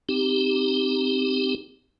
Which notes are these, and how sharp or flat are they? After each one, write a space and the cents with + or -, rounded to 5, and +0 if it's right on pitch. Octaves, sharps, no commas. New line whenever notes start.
C4 -15 D#4 -5 G4 +0